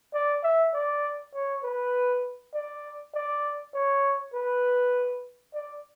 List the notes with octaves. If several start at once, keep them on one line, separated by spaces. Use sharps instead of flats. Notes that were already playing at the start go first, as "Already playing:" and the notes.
D5
E5
D5
C#5
B4
D5
D5
C#5
B4
D5